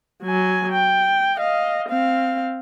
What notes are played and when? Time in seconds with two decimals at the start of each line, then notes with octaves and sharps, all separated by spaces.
0.23 F#3 G#5
0.72 G5
1.37 D#5 F5
1.89 C4 F5